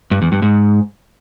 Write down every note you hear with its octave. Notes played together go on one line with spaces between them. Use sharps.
G2
E2
G2
G#2